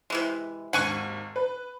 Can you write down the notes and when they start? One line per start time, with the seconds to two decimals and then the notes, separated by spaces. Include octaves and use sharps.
0.10 C3 E3 G#3
0.73 G#1 D#2 F#5 G#5 C#6
1.36 B4